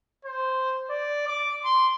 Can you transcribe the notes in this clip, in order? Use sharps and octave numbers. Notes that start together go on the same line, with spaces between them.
C5
D5
D6
C6